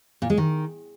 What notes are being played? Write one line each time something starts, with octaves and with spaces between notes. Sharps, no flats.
A#2
G#3
D#3